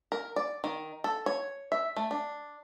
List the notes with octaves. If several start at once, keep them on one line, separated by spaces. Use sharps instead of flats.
A#4
D5
D#3
A4
C#5
E5
A3
D4